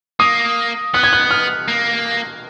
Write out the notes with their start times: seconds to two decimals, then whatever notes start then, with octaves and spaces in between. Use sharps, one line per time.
0.20 A#3 D#6
0.94 B3 F#6
1.04 G#6
1.13 F#6
1.31 F6
1.68 A#3